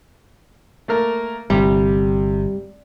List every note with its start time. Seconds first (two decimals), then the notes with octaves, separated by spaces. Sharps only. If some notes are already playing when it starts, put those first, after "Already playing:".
0.88 A3 A#3 A#4
1.50 G1 C3 G3